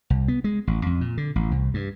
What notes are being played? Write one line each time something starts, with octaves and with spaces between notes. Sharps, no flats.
C2
B3
G#3
A1
F2
A#2
D3
A1
C2
G2